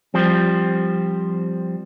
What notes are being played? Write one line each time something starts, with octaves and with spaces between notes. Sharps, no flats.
F3 G3 C4